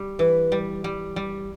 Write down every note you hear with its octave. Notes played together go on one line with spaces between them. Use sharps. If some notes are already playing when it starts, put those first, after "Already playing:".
Already playing: G3
E3 B4
G3
G3
G3